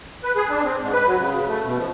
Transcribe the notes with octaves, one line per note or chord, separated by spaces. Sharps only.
B4
G#4
D4
C4
G#2
B4
F#3
C#3
A3
B2
F3